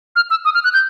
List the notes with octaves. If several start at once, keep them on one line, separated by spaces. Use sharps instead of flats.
F6
E6
D#6
F6
F#6
G6